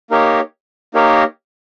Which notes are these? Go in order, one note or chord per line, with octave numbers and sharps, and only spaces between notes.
A#3 D#4 G4 A#4 C#5
A#3 D#4 G4 A#4 C#5